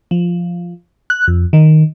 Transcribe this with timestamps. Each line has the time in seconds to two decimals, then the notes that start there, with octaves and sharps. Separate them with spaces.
0.11 F3
1.10 F#6
1.28 F2
1.53 D#3